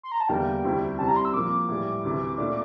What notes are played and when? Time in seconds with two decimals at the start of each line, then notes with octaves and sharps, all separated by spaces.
0.03 C6
0.12 A#5
0.20 A5
0.29 E2 D3 G3 A#3 G5
0.63 D2 C3 G3 C4 E4
0.99 C3 G3 C4 E4 A5
1.08 A#5
1.16 C6
1.25 E6
1.34 A#2 F3 A#3 D6
1.69 A2 E3 G3
2.04 D2 C3 E3
2.38 A#2 A3 D4